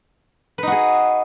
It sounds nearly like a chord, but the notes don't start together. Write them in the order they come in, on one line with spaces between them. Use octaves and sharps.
B4 D#4 F#4 G#4